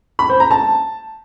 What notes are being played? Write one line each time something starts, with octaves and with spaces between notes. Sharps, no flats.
B5
C5
A#5
A5